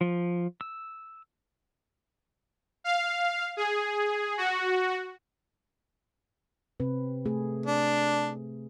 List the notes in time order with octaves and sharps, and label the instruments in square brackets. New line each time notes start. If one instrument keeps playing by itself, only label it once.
[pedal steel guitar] F3
E6
[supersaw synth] F5
G#4
F#4
[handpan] C3 C4 B4
A3 G#4
[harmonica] D4